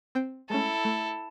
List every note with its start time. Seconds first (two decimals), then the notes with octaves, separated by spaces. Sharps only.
0.15 C4 C5 G5
0.50 G#3 A3 C#4 E4 A4
0.85 A3